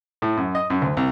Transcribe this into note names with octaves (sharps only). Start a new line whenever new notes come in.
A2
F#2
D#5
F#2
D2
C2